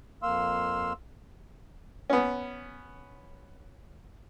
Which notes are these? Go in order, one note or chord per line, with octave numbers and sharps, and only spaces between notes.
F2 A#3 F5 C6 E6
B3 C#4